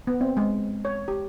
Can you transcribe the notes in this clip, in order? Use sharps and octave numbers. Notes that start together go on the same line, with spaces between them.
B3
C4
G#3
C#5
G4